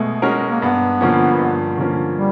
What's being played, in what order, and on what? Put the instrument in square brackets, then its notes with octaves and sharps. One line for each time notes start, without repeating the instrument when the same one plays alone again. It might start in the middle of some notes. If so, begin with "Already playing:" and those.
Already playing: [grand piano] B2 G#3 [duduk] A3
[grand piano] G#3 C#4 F#4 A#4
[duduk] A#3
[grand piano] G2 [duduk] B3
[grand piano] D3 F3 A#3 C#4
G2
D3 F3 A#3 C#4
[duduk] G3